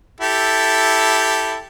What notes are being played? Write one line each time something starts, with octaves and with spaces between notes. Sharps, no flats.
E4 G4 A4